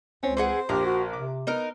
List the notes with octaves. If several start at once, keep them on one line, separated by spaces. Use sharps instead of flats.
C#2 C4 C#4
E3 G#4 C5 F#5
A#1 G4 A#4
F#4
C3 D6
B3 D#4 A#4